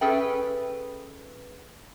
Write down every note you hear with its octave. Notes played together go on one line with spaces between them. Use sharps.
C#4 G#4 A4 B4 E5 G5